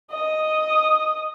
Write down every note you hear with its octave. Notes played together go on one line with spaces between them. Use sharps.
D#5 D#6